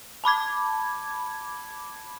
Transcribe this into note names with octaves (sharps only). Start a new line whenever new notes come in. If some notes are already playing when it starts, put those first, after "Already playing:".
A5 B5 D6 G#6